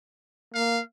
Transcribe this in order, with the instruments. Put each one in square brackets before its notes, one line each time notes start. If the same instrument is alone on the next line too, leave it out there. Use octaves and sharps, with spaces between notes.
[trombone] A#3 [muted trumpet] F5